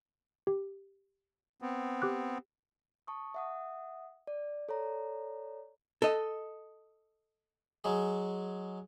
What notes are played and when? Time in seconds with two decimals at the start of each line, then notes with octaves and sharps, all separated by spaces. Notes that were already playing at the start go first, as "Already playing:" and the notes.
0.47 G4
1.62 B3 C4
2.02 G4 D6 F#6
3.07 A5 C#6 D#6
3.34 E5 F#5 D#6
4.27 D5
4.69 A4 C#5 D5 A#5
6.02 A4 D#5
7.84 F#3 G#3 G#4